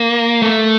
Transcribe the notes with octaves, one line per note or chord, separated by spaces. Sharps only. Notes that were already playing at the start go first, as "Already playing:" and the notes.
Already playing: A#3
A3